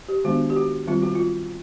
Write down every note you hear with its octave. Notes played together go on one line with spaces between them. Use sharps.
G4
D#3 G#3 B3 D4 F#4
G4
F#4
D#3 G3 C4 F4
F#4
F4